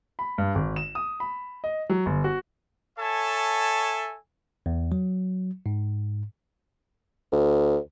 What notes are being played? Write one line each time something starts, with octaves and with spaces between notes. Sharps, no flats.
B5
G2
G#1
E7
D#6
B5
D#5
F#3
G1
F#4
A4 C#5 E5 G#5 A5
E2
F#3
G#2
D2